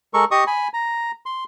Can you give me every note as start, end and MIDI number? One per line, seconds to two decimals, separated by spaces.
0.14 0.25 56
0.14 0.25 69
0.14 0.25 70
0.14 0.25 85
0.31 0.44 67
0.31 0.44 75
0.31 0.44 85
0.31 0.44 87
0.47 0.68 80
0.47 0.68 83
0.74 1.11 82
1.26 1.44 84